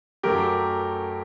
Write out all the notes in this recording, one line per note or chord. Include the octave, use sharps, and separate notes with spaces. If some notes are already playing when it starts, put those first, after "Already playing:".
F#2 F#3 A3 G4 A#4